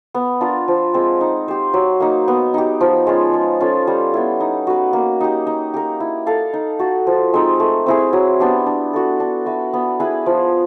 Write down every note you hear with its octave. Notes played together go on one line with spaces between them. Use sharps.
B3
D4 F4 A#4
F3
G#3 C4
D#4
G4 C5
F#3
A#3 D#4
B3
D#4 G4
F3
G#3 C#4 F4
G#3
C#4 F4 A4
G3
B3 E4
D#4
F#4 B4
A#3
D#4 G4
D#4
G4 A#4
E4
A4 D5 F5
D#4
F#4 A4
F3
G#3 C4 D#4
A3
C4 E4 G#4
F#3
B3 D4 G4
D4
F#4 A4
D4
F#4 B4 E5
B3
E4 G#4 B4
F3